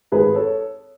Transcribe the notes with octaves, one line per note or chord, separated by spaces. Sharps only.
G#1 G#4 B4
A4 C#5